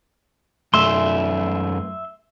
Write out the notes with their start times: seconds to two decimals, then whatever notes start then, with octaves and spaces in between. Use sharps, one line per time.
0.74 F#2 A3 E5 C6